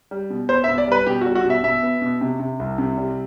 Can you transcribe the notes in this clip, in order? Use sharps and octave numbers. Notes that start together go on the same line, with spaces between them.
G3
B2
B3 C5
E5
B2
D5
G3 B4
B2 G4
F#4
G3
F#4
B2
E5
B2 E5
B3
B2
C3
C3
C2
C3
G3